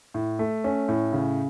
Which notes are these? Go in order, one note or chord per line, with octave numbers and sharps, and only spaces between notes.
A2
A3
C#4
A2
C#3